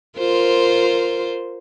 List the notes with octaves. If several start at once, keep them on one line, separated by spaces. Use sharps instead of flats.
F4 A#4 C5